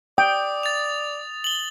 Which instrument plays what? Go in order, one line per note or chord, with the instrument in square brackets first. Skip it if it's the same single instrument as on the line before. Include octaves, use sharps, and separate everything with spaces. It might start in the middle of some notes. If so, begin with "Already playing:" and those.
[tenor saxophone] D5 [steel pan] G5 [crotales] D#6
[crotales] A6 F7
F#7 G7